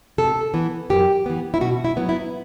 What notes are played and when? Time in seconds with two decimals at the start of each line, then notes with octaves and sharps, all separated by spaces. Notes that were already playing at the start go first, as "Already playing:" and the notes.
0.18 C3 A4
0.54 E3 B3
0.90 F#2 G4
1.26 E3 B3
1.54 E4
1.61 B2 F#4
1.85 E4
1.97 F#3 B3
2.09 E4